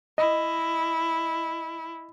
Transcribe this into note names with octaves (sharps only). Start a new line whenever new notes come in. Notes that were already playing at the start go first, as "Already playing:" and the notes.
E4 D#5